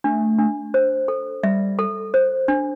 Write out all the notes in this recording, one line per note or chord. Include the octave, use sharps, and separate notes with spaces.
A3 D4
D4
C5
A4
G3 E5
A4
C5
D4